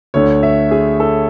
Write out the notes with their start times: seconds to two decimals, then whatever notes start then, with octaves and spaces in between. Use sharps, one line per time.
0.14 D2 D3 A3 C#5
0.43 E5
0.71 G#4
1.00 A4